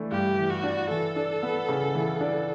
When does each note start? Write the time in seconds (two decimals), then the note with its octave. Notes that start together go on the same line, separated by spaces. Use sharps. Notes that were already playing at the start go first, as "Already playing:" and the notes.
Already playing: E3 A3 D4
0.11 G2 G4
0.38 E3
0.50 F#4
0.64 D4
0.90 E3 A4
1.16 D4
1.43 B3
1.69 C#3
1.95 E3
2.21 D4